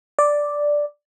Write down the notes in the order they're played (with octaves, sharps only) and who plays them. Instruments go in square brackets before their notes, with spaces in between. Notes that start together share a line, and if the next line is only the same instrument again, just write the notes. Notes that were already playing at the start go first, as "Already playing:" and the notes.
[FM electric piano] D5